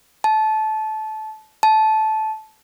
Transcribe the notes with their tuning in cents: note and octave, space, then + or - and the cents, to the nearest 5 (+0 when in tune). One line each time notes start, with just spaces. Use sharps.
A5 -20
A5 -15